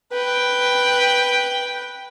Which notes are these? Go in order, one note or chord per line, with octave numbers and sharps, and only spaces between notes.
B4 G5